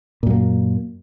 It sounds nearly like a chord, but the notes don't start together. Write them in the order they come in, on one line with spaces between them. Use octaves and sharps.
A#2 F#2 A#3